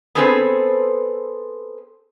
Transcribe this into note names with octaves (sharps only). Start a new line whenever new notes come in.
B3 C4 G#4 A4 B4 C5